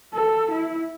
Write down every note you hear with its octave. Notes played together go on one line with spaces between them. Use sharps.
A4
E4